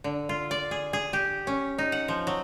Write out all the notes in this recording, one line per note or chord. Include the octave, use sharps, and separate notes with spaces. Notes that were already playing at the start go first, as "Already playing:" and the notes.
D3
F4
D5
G#4
G#4
G4
C#4
D#4
F#5
F3
F#3